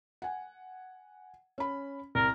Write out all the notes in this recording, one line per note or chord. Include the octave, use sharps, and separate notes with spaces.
F#5 G#5
C#4 B5
C2 A#4